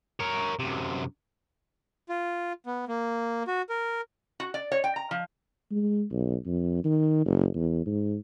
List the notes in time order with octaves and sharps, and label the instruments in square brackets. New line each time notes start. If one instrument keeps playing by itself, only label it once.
[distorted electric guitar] A#4 C#5
F#2 C3
[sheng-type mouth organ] F4
B3
A#3
F#4
A#4
[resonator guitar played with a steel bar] F#4
D5
C#5
G5
A#5
F3
[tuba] G#3
B1
F2
D#3
F#1
E2
G#2